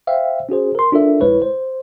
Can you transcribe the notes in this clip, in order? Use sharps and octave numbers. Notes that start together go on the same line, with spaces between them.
C5 E5 F5 G5
C#4 F#4 G#4 C5
A#4 C6
D4 F4 A4 A#4 E5
A#1 G#3 E4 B4 C#5
C5